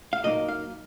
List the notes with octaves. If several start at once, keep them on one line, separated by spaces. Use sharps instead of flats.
F5
A#2 F#3 A#3 D#4 D#5
F5